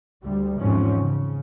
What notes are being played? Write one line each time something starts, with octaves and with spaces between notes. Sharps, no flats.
D2 G3
E2 G#2 B2 F3 C4 C#4
C#3